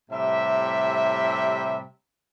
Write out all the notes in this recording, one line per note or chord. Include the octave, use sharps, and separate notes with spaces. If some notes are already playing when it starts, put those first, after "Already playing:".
A2 C3 G3 E5